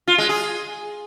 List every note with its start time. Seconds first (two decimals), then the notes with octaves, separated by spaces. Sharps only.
0.07 F4
0.18 G#3
0.29 G#4